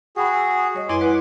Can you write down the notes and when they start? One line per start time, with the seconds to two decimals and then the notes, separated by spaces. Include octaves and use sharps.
0.16 F#4 G#4 G5 B5
0.35 C#6 E6
0.74 G3 C#5 D#5
0.89 F#2 E4 B4 G#5 C6 D6
1.01 E4 B4 F#5 D6